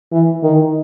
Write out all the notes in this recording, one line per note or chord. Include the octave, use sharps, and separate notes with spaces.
E3
D#3